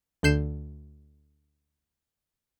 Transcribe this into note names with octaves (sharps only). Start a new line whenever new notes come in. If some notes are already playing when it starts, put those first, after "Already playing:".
D2 D3 G6 C7 E7